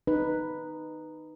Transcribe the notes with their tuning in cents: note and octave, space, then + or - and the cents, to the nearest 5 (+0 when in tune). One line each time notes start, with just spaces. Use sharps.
D#4 -10 B4 +0